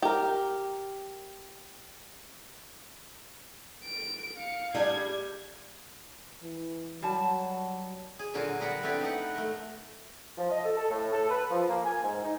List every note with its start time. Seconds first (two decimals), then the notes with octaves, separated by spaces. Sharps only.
0.02 G4 A#4
3.85 D7
4.38 F5 C#7
4.74 G3 D4 G#4 G#6
6.43 E3
7.02 F#3 G3 A5
8.19 G#4
8.34 A#2 D3 F#3 F4 F#4
8.60 G3 B3 F#4 A#4 F#5
8.83 A3 B3 C4 D4 E4 G4
9.00 B3 D#4 F#5
9.35 A3 A#4
10.38 F3
10.50 D#5
10.64 A4
10.77 A4
10.91 A2
11.12 A4
11.29 B4
11.51 F3
11.69 A#3
11.85 G#5
12.04 G#2
12.24 D#4